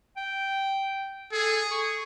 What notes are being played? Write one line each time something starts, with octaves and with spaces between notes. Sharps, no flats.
G5
G#4 A4
C#6